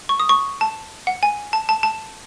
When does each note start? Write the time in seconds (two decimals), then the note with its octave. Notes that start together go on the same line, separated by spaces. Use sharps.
0.09 C#6
0.20 D#6
0.29 C#6
0.61 A5
1.07 F#5
1.23 G#5
1.53 A5
1.69 A5
1.83 A5